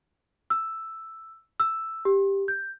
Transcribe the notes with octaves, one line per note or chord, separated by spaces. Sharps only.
E6
E6
G4
G6